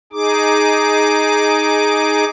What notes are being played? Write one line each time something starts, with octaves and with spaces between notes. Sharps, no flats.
D#4 G#4 D6